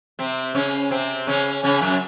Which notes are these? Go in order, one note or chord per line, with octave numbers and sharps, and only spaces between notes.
C3 C4
C#3 C#4
C3 C4
C#3 C#4
C#3 C#4
F#2 F#3